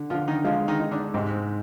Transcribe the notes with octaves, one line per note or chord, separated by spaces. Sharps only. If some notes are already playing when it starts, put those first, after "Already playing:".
Already playing: D3
D3 F3 F4
D#3 D#4
F3 G#3 F4
D#3 D#4
D#4
D3 D4
G#2 C3 C4